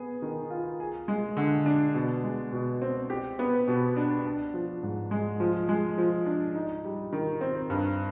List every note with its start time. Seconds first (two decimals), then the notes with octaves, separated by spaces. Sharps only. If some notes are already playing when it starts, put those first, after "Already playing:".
Already playing: B3 G#4
0.22 D#3
0.50 F4
0.80 G#4
1.08 G#3
1.37 D3
1.66 D4
1.94 B2
2.24 G#3
2.53 B2
2.82 C4
3.10 G4
3.39 B3
3.68 B2
3.96 D4
4.25 D4
4.54 F3
4.83 G#2
5.11 G#3
5.40 F3
5.69 G#3
5.98 F3
6.26 D4
6.55 D#4
6.84 G3
7.13 D#3
7.41 C4
7.70 G2